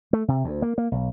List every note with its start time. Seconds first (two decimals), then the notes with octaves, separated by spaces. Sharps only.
0.13 A3
0.28 C3
0.44 D2
0.62 A#3
0.78 A#3
0.92 B1